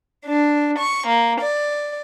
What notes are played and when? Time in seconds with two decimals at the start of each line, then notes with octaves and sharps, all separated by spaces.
0.25 D4
0.77 C#6
1.06 A#3
1.40 D5